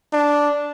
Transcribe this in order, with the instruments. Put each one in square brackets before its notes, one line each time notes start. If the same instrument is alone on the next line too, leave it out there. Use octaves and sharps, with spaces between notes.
[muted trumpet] D4